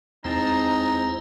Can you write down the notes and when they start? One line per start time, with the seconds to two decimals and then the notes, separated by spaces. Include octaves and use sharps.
0.24 E2 G#3 C4 D#4 E4 C5 A5 A#5